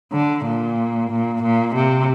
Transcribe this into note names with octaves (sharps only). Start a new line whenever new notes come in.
D3
A#2
A#2
A#2
C3